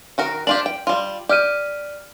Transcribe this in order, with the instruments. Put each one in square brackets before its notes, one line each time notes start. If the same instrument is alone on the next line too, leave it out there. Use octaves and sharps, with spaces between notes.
[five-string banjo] D#3 F#4 A#4
[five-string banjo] D4 F4 G4 [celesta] F#7
[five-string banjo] G5
G3 F4
[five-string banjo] G4 [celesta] D5 F6 D#7